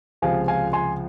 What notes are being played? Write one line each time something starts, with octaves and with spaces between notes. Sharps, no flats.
C#2 C3 F3 G#3 F5 G#5
F5 G#5
G#5 C6